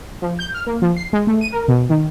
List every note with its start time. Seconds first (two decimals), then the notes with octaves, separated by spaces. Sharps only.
0.22 F3
0.39 G6
0.54 F6
0.67 A#3
0.82 F3
0.96 C7
1.13 G#3
1.27 A3
1.41 D#7
1.52 A#4
1.68 B2
1.90 D#3